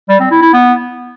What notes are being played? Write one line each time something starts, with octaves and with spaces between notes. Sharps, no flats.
G3
C4
E4
E4
B3